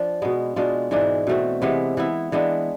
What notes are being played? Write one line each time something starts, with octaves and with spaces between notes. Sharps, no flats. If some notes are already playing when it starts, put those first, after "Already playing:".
Already playing: F3 D4 F4
B2 G#3 B3
B2 G#3 D4 F4
G#2 E3 G#3 D4
B2 A3 C4
C3 E3 G#3 B3
E3 B3 E4
E3 G#3 B3 D4